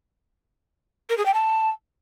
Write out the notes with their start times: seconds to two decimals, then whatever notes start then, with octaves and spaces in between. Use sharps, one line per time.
1.10 A#4
1.18 G#4
1.26 G5
1.34 A5